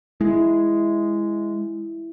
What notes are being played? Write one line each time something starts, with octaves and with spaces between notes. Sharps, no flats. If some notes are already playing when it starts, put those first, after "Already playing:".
G#3 E4